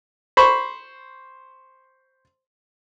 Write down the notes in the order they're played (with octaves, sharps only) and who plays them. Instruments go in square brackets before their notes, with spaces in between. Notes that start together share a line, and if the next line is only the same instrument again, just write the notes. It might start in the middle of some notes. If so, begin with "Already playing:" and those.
[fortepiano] C5 B5 C#6